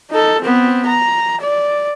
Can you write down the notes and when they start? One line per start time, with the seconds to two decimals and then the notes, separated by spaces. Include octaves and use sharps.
0.11 D#4 A4
0.42 B3 C4
0.86 A#5
1.41 D5